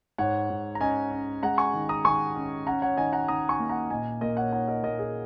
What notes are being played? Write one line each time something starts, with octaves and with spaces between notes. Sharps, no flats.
G#2 C#5 F#5
G#2
A#5
C#4 D#5 G#5
C#4
G#3 F#5 A#5
G#5 C#6
D#3
A#5 D#6
D#3 G#5 C#6
C#4
C#4 F#5 A#5
C#5 F#5
D#3 D#5 G#5
F#5 A#5
D#3 A#5 D#6
G#5 C#6
A#3
F#5 A#5
A#2 D#5 G#5
A#2 A#4 D#5
C#5 F#5
D#4 C#5 F#5
A#4 D#5
A#2 A#4 D#5
G#4